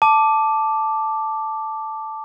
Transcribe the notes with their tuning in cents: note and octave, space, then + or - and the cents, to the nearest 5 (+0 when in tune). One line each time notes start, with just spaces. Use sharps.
A5 +0 D6 +0